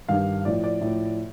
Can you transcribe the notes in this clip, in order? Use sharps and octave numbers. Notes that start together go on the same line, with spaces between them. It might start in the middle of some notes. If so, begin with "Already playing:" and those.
G2 D#3 G3 F5
A2 F3 D5
D5
A2 F3